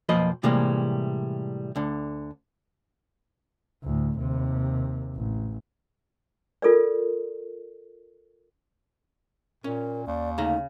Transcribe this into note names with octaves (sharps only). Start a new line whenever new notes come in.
B1 F2 F3 A#3 B4 D#5
A2 C3 E3 G3 G#3 A#3
D2 D3
D2 A2
D#2 C3
A1
F4 A4 A#4 D5
A#2 C#4 A#4
D#2 D5
D2 C#3 A3 D#4 A#5